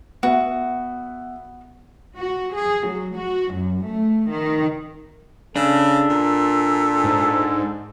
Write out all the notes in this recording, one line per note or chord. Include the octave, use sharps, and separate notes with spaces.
B3 F#4 E5
F#4
G#4
F#3
F#4
F#2
A3
D#3
C#3 D4 A4
A#2
G#2